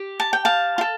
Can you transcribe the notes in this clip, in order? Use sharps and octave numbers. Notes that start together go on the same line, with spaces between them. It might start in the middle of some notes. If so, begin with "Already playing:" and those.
Already playing: G4
A5
G5
F5 A5
F4
A4